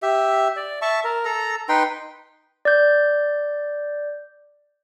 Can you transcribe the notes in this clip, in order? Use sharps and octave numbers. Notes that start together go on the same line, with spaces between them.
G4 E5
D5
E5 A5 C#6
A#4
A4 A#5
D#4 B4 G5 C6
D5 G6